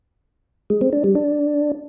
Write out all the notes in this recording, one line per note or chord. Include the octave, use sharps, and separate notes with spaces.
G#3
C4
D4
G3
D4